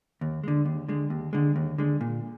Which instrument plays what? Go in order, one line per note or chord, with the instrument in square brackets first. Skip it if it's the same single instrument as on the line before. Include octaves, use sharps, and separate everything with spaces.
[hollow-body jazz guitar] D#2
D3 G#3
D#2
D3 G#3
D#2
D3 G#3
D#2
D3 G#3
A#2